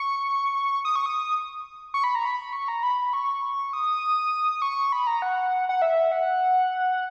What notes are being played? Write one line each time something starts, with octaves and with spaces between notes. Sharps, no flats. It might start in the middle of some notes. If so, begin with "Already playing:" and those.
Already playing: C#6
D#6
C#6
D#6
C#6
B5
A#5
B5
C#6
A#5
B5
C#6
D#6
C#6
B5
A#5
F#5
F#5
E5
F#5